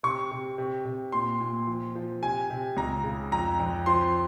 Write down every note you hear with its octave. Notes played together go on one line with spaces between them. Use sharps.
C3 C#6
C3
C3
C3
A#2 C6
A#2
F3
F3
C3 G#5
C3
C#2 A#5
C#3
F2 A#5
F2
F3 C6